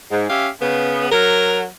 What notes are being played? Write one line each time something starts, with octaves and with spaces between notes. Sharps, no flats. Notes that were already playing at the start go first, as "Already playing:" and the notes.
G#2
C#4 G4 E5 F5
C#3 B3
F#3 A#4